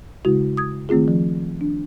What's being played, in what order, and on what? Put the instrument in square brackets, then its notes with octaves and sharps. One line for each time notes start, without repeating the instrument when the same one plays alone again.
[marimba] C#3 G#3 E4 F#4
D#6 G#6
D#3 A3 C4 F4 G#4
F3
D4